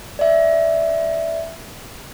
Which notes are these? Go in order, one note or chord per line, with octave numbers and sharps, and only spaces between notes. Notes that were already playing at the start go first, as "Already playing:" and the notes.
D5 E5